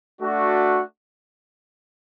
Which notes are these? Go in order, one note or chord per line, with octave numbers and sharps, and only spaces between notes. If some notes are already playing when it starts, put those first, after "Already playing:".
A3 D4 F#4